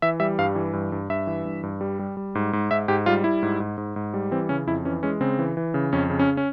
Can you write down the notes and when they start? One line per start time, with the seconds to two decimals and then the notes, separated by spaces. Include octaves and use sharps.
0.02 E3 E5
0.20 G3 E5
0.39 G2 F5
0.56 E3
0.73 G2
0.92 G2
1.10 G2 E5
1.27 E3
1.45 G2
1.63 G2
1.81 G3
1.99 G3
2.17 G3
2.35 G#2
2.53 G#2
2.71 G#2 E5
2.88 G#2 G4
3.06 G3 F4
3.24 G3 E4
3.43 G#2
3.60 G#2
3.78 G#2
3.96 G#2
4.14 G3
4.31 E3 C4
4.49 C#3 C#4
4.67 F2 E4
4.85 E3 C#4
5.03 G#3 C#4
5.21 C#3 C4
5.39 E3
5.57 E3
5.74 C#3
5.93 F2 C#4
6.10 C#3
6.19 C#4
6.37 C#4